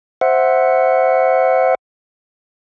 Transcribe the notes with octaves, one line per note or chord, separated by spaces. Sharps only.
C5 E5 F#5